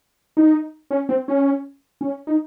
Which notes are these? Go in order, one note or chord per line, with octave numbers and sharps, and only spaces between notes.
D#4
C#4
C4
C#4
C#4
D#4